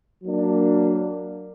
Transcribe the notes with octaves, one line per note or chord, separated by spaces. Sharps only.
F#3 A#3 D4